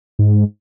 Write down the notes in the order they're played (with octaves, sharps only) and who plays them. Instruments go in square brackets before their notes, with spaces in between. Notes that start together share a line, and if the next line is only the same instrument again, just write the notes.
[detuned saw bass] G#2